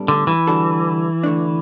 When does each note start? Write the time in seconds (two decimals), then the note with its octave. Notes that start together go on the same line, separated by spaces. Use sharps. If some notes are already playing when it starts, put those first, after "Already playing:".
Already playing: A2 G3 B3 D4 A4
0.08 D3
0.27 E3
0.47 D3 G3 D4 F#4 A4
1.23 D3 A3 D4